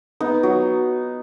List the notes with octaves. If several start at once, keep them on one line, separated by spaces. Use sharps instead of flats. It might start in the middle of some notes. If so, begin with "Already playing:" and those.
B3 D#4
F#3